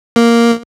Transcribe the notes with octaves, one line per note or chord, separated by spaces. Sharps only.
A#3